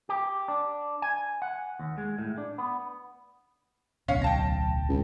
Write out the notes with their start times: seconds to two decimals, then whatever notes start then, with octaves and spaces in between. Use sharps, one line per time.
0.09 G4
0.48 D4
1.02 G#5
1.42 F#5
1.79 D#2
1.98 G#3
2.19 A2
2.38 D4
2.58 B3
4.08 D1 B1 C#4 C#5 F5
4.22 G5 A5 A#6
4.89 C#2